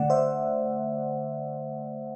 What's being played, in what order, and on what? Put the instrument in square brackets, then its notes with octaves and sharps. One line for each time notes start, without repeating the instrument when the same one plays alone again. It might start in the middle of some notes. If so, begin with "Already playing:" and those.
Already playing: [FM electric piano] D3 A3 D5 F#5
C5 E5